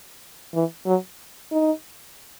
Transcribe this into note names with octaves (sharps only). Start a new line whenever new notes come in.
E3
F#3
D#4